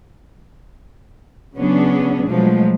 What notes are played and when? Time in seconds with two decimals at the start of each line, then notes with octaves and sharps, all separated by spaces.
1.56 C#3 F#3 B3 C#4 D4 G#4
2.26 B2 F3 F#3 G#3 A3